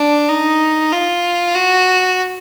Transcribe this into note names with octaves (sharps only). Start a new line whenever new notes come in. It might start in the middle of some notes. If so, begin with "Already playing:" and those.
Already playing: D4
D#4
F4
F#4